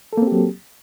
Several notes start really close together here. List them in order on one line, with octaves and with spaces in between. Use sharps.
A4 A#3 C4 G4 F#3